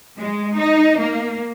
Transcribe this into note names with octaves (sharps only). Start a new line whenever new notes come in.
G#3
D#4
A#3